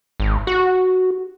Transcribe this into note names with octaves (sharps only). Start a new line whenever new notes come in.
G#1
F#4